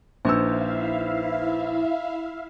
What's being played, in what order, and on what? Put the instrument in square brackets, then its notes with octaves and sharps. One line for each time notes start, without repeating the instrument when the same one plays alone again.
[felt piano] A#1 E6 [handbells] D#4 B4 C5 [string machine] E4 E5 F5